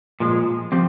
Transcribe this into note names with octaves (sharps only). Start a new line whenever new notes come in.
A#2 F3 G#3
F3 C4 G4